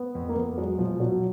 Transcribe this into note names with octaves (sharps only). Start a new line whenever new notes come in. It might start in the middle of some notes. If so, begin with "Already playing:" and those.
Already playing: B3
F2
A#3
F2 B3
F#3 G#3
B2 F3
B2 F#3